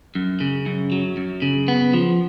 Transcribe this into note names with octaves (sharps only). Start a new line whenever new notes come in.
F#2
C#3
F#2
F#3
F#2
C#3
B3
F3